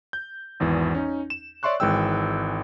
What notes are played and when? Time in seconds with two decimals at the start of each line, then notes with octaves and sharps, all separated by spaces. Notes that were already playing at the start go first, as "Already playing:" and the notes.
0.13 G6
0.60 G#1 E2 E3
0.95 C#4 D#4
1.30 E7
1.63 C#5 D5 E5 C6 C#6 F#6
1.80 G#1 E3 G#3 G5 E6